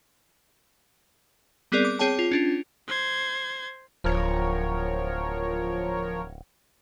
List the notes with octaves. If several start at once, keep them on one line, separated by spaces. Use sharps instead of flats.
G3 B3 C4 G#4 A#4 D5
D6
C4 G#4 C#5 G5 A5
F4
C#4 D4 F4
C5 G#6
D1 F3 A#4 C#5